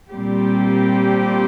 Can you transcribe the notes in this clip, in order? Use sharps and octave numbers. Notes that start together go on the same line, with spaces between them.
A#2 G3 C4 G4